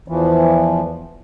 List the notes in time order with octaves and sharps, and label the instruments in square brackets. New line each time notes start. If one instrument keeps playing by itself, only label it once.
[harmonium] E2 E3 F3